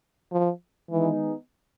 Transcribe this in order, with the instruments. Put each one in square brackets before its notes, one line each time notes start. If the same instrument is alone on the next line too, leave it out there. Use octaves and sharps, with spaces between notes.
[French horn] F3
[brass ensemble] D#3 G#3 B3 D#4 G#4 [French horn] E3